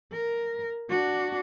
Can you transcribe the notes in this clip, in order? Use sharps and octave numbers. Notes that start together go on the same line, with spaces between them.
A#4
D4 F#4